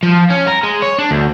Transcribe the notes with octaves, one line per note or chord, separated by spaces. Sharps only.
F3
C#4
A#4
G#3
C#5
D4
D2